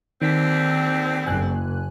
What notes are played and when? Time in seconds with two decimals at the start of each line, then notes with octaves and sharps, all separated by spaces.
0.22 D#2 D3 D#3 C4 B6
1.27 F#1 G#5 F#6